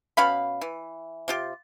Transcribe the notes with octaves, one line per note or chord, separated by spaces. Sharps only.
B2 C#4 F5 B5
E3
C3 F4 G4